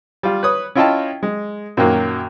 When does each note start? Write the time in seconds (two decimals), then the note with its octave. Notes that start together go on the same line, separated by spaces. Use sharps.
0.23 G3 F4
0.43 B4 C#5 D#6
0.75 C#4 E4 F4 D#5 G5 A5
1.23 G#3
1.77 F#2 A#2 D#3 F#3 A#3